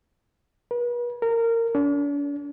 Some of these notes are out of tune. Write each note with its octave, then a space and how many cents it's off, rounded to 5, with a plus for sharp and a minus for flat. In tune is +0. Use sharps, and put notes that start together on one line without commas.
B4 -40
A#4 -20
D4 -45